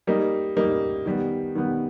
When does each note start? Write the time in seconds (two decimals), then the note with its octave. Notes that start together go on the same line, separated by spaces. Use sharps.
0.07 G3 A#3 D#4
0.57 G3 A#3 D#4
1.06 D#3 G3 B3
1.55 D#3 G3 B3